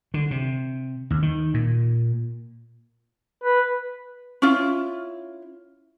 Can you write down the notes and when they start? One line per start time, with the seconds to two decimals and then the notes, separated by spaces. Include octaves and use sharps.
0.14 D3
0.31 C3
1.10 D#2
1.22 D#3
1.54 A#2
3.44 B4
4.42 C#4 E4 F4